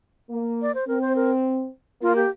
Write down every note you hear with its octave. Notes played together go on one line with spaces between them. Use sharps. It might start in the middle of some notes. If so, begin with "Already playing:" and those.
A#3
D5
C5
C4 A#4
C5
A#4
A#3 F4
G4